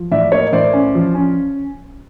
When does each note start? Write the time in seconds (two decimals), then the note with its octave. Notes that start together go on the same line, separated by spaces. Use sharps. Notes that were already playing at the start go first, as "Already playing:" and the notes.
Already playing: F3
0.11 A2 D5 E5
0.32 A#3 C#5 D#5
0.53 A2 C5 D5
0.73 C#4
0.95 F3
1.15 C#4